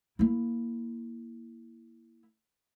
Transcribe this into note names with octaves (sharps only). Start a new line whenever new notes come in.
A#3 E4